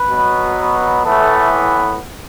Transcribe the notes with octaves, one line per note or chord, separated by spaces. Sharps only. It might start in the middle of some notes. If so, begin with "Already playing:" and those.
Already playing: B4
B2 F#3 B3
A2 E3 A3 B3 A4